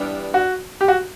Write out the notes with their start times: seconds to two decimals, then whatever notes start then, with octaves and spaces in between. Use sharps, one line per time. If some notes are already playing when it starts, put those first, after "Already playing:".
Already playing: G2 E3 G3 B3 D4
0.34 F#4
0.81 G4
0.88 F#4